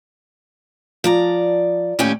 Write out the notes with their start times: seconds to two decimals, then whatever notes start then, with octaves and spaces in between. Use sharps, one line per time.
1.04 F3 D5 A#5
1.99 D#2 A2 C#4 G4 G5 G#5